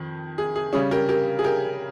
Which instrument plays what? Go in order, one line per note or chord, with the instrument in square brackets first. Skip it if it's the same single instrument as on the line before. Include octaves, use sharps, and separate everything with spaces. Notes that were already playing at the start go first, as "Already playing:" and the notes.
Already playing: [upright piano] F2 D#3
G#4
G#4
C#3 G3 C#4 G#4
G4 A#4
G4 A#4
G#4
G4 A#4